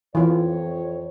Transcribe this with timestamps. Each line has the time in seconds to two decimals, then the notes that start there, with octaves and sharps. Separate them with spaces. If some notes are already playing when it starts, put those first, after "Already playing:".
0.15 F2 E3 F4 C#5